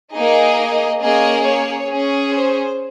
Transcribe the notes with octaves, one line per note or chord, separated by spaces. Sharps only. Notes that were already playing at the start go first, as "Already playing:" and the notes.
A#3 D#4 G#4 D#5
A#3 C#4 G#4 D#5
C#5
C#4 G#4
C5